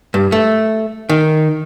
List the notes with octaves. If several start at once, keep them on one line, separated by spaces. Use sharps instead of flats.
G2
A3
D#3